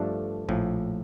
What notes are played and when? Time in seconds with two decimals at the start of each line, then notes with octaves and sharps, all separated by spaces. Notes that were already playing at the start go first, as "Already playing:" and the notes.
Already playing: G2 F3 A3 D4 A4
0.49 A#1 A2 F3